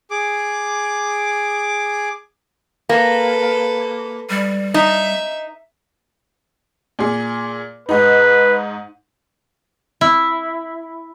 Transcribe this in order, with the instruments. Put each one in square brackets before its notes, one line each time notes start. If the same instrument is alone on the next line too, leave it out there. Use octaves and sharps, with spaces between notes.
[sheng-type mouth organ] G#4 D6
[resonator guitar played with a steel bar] A#3 [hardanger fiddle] A4 B4
[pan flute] G3
[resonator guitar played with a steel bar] D#4 [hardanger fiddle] E5
[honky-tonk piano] A#2 G#4
[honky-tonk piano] G#2 D#4 [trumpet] B4
[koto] E4